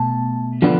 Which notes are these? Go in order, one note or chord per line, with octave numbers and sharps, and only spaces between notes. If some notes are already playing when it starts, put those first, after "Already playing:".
Already playing: B2 A3 A5
D3 F3 B3 D4